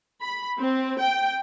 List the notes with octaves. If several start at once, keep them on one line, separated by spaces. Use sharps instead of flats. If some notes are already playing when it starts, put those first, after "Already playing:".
B5
C4
G5